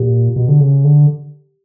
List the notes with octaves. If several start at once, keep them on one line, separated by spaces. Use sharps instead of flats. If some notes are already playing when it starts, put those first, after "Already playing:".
Already playing: A#2 G4
B2
D3
C#3
D3